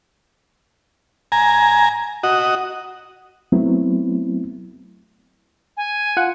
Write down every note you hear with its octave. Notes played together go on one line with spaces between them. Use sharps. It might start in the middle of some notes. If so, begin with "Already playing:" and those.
G#5 A#5
F#4 D#5
F#3 A3 B3 C4 E4
G#5
F4 F#5